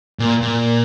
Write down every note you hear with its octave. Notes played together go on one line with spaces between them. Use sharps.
A#2
A#2